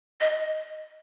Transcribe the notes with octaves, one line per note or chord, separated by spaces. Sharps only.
D#5